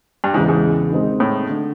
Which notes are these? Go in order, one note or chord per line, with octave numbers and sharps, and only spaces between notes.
G2
E2 G#2 C#3 E3
G#2
D#3 G#3 C4 D#4
A2
D3